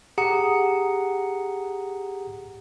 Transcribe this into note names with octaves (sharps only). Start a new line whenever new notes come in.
G4 G#4 F#5 A#5 D#6 C#7